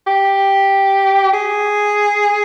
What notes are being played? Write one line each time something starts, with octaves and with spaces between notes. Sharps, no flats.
G4
G#4